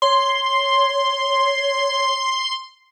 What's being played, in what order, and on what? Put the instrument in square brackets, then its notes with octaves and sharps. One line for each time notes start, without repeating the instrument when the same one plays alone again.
[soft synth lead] C#5 [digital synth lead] C6